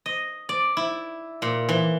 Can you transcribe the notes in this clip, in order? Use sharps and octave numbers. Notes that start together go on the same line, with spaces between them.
D#5
D5
E4
A#2
E3